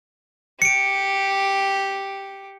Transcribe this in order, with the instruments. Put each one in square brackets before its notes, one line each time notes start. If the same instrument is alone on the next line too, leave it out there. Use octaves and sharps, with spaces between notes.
[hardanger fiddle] G4 [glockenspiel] C#7 D7